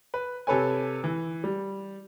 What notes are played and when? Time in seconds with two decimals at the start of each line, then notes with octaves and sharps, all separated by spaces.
0.14 B4
0.47 C3 A4 B4 C#5 G#5
1.04 E3
1.44 G3